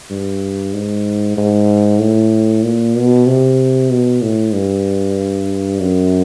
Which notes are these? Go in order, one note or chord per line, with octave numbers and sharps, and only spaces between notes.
G2
G#2
G#2
A2
A#2
B2
C3
B2
A2
G2
F#2